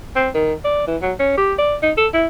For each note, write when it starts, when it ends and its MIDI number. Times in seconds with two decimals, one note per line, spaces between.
0.16 0.29 60
0.35 0.53 51
0.64 0.87 74
0.87 0.96 52
1.02 1.13 54
1.19 1.34 61
1.37 1.53 67
1.58 1.76 74
1.82 1.92 63
1.97 2.08 69
2.13 2.27 64